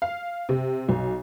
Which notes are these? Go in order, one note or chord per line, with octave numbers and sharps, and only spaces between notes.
F5
C3
B1